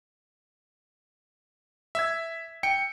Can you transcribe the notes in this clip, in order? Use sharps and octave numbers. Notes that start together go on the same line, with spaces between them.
E5 E6 G#6
G5 C#7